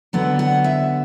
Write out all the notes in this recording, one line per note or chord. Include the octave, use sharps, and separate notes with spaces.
D3 F#3 B3 F#5
F#5
E5